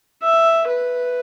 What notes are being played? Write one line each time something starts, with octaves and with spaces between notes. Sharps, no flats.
E5
B4